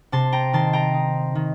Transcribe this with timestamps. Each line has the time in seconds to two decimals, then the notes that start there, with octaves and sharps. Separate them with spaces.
0.12 C3 A5 C6
0.32 G5 A#5
0.53 D#3 A5 C6
0.73 G5 A#5
0.94 D#4
1.35 D#3